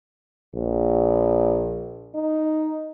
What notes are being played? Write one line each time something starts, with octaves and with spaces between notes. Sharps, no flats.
A#1
D#4